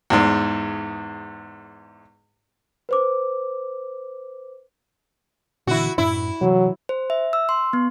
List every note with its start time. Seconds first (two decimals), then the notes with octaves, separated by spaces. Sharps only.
0.10 E2 G#2
2.89 B4 C5 D6
5.67 A#2 D3 E3 E4 F#4
5.98 F#2 A2 E4
6.42 C3 E3 F#3
6.89 C5
7.10 E5
7.33 E6
7.49 C6
7.73 B3